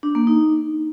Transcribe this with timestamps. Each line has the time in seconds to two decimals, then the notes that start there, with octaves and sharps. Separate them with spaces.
0.03 D4
0.15 A#3
0.27 D#4